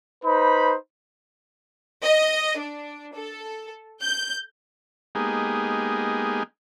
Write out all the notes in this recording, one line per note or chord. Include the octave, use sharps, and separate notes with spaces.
D#4 B4 C5 B5
D#5
D4
A4
G6
G#3 A#3 B3 D#4 G4 G#4